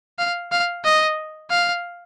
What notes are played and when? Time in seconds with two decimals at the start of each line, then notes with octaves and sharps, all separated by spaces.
0.19 F5
0.52 F5
0.84 D#5
1.50 F5